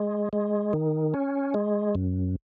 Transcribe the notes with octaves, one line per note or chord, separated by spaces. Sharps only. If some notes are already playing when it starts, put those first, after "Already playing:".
Already playing: G#3
G#3
D#3
C#4
G#3
F#2